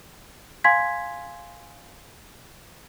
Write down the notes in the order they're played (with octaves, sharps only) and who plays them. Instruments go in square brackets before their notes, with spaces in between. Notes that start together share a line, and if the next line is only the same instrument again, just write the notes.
[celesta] F5 G#5 C6 G#6 B6